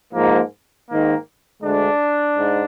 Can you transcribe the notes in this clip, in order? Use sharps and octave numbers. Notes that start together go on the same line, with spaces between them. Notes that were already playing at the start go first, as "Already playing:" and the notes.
G#2 F3 A#3
G#2 D#3 A#3
D2 D3 G#3 D4
G#2